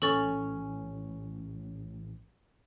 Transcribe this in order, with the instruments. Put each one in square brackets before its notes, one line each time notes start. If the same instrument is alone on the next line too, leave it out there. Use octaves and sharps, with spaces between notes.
[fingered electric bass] A#1 A2 E3 [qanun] C#4 [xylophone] A4 C#6 A6